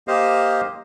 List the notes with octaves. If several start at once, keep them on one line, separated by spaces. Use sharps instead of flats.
A#3 G4 C5 D#5 F5